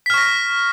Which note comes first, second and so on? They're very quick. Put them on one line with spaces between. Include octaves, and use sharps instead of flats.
B6 F6 C#6 A#6